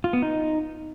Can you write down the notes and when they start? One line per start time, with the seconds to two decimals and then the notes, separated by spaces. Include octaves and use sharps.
0.04 F4
0.13 B3
0.22 D#4